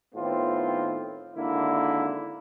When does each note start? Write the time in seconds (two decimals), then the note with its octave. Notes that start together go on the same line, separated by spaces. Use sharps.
0.14 A2 D#3 B3 C4 F4
1.35 G#1 D3 A#3 E4